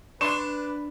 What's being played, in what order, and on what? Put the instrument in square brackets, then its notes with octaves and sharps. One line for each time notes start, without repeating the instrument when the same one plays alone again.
[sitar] D4 [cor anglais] B4 [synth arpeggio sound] C6 C#6 [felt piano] E7